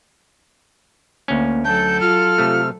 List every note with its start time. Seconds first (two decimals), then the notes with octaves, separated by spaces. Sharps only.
1.28 D2 A#3 C#4
1.65 F#3 A4 A5 G6
2.01 F4 F6
2.38 C3 A3